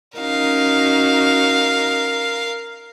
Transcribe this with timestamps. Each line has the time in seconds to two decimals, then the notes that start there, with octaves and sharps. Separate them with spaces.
0.18 C#4 D#4 F#4 A#4 F5